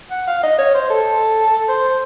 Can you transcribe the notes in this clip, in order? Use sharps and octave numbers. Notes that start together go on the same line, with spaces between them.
F#5
F5
D#5
C#5
C5
A4
C5